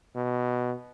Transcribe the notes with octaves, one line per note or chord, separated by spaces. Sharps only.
B2